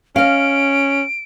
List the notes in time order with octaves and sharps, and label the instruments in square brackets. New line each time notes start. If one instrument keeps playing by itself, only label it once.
[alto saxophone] C#4 [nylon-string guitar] D#5 F5 [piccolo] D7